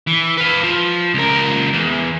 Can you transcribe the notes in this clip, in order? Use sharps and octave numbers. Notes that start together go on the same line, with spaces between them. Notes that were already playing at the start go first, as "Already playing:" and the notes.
E3
B4 F5
F3
C#2 A#4
E2